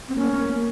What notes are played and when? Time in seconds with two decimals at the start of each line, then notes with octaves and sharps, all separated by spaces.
0.08 C4
0.16 A#3 C#4
0.33 A#3
0.49 A#3